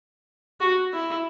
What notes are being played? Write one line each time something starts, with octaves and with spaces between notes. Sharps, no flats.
F#4
E4